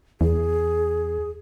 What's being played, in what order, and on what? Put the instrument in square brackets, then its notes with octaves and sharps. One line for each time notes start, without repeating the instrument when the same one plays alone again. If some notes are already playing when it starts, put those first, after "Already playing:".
[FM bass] E2 [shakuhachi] G#4